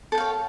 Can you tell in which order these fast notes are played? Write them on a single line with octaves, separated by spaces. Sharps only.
A4 G5 F5 C#5